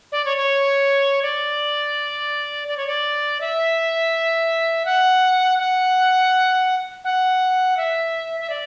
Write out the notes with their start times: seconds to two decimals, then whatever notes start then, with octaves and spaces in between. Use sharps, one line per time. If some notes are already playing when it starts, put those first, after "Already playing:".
0.12 D5
0.25 C#5
0.37 C#5
1.22 D5
2.68 D5
2.77 C#5
2.87 D5
3.41 E5
4.85 F#5
5.59 F#5
7.04 F#5
7.77 E5
8.40 E5
8.50 D5